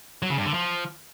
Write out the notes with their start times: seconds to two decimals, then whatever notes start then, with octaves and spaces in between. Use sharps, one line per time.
0.22 F#3
0.30 C#3
0.38 G2
0.46 D3
0.54 F3